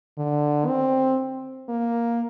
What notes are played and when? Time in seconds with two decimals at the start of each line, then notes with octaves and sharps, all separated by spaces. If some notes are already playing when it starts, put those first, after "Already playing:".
0.18 D3
0.68 C4
1.69 A#3